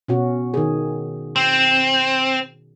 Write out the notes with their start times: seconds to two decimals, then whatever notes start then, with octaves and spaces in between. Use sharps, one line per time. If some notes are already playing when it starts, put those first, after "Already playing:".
0.08 B2 C#4 F#4
0.54 D#3 G#4
1.36 C4